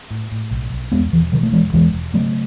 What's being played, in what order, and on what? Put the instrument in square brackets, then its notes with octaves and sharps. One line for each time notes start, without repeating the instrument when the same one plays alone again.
[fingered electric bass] A2
A2
B1
B1
E2 G#3 B3
E1 E3
B2 D#3 F#3
A3
E1 E3 G#3
E2 E3 G#3
E1
C#3 F#3 A3